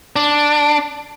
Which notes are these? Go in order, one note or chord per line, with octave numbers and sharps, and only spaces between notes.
D4